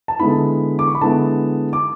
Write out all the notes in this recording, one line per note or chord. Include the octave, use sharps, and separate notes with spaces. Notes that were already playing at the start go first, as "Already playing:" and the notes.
A5
D3 G#3 B3 E4 B5
D6
C#6
B5
D3 G#3 B3 E4 A5
D6